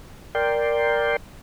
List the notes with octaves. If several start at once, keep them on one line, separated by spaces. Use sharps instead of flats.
A#4 D5 G5 C6